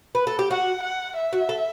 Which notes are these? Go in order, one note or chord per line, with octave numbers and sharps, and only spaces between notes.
B4
A4
G4
F#4 F#5
F#5
E5
F#4
A4